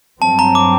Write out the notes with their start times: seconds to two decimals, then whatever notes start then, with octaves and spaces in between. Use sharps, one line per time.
0.21 G2 F#3 C4 A5
0.39 A#5
0.55 D6